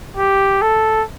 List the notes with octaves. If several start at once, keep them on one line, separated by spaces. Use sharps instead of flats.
G4
A4